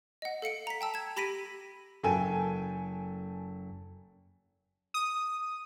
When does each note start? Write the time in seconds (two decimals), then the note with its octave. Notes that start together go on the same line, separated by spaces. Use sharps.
0.22 D#5 F#5
0.42 A4 F5 C#7 D7
0.67 A#5 B6
0.81 G5 A5 E6
0.94 G#6 E7
1.17 G4 B5 A#6 B6 D7 D#7
2.03 F#1 A4 G5 G#5 D#7
4.94 D#6